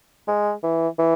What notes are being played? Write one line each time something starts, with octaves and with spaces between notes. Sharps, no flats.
G#3
E3
E3